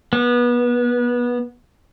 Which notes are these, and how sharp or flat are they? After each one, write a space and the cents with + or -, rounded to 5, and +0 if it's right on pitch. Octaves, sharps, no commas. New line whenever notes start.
B3 -25